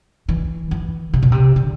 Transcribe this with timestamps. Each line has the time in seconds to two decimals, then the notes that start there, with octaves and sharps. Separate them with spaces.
0.29 E3
0.71 E3
1.13 C3
1.22 B2
1.32 C3
1.56 D3